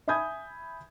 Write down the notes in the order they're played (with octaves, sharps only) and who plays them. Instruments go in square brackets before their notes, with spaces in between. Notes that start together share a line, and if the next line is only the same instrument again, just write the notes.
[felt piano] E5 G#5 B5 D#6 G6 G#6